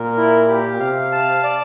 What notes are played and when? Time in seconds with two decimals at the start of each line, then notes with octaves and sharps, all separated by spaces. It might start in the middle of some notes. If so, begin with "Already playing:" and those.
Already playing: A#2 A#4
0.17 E4
0.48 G4
0.79 C3 F5
1.12 A5
1.44 D5